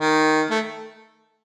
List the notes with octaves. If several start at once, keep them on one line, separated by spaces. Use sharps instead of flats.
D#3
A3